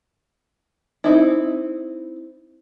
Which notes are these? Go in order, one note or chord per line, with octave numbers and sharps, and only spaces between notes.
C4 D#4 E4